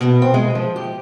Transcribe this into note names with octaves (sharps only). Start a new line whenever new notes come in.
B2
C4
G#3
F3
G4